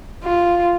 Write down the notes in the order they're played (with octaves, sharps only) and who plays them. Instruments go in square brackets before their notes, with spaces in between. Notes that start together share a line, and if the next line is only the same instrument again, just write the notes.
[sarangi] F4